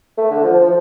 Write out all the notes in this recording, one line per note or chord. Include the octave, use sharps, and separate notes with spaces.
A3
D3
F3
F3